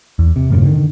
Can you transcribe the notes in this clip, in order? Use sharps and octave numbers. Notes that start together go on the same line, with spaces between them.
E2
C3
E1 G2 A#2 C#3
D3 D#3